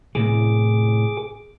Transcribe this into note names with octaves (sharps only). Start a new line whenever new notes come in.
A2 C3 E3 G#4 D6